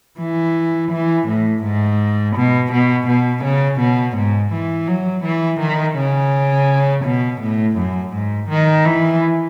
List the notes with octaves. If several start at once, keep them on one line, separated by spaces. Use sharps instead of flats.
E3
E3
A2
G#2
B2
B2
B2
C#3
B2
G#2
E3
F#3
E3
D#3
C#3
B2
A2
F#2
G#2
D#3
E3